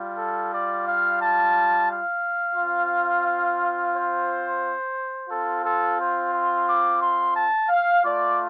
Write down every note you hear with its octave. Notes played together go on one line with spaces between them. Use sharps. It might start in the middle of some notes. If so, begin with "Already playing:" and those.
Already playing: G3 F4
A4
D5
F5
A5
F5
C4 F4
C5
C4 F4 A4
A4
C5
C6
D6
C6
A5
F5
A3 F4 D5